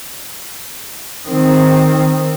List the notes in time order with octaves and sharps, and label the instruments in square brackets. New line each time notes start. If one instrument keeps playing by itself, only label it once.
[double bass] D#3 C4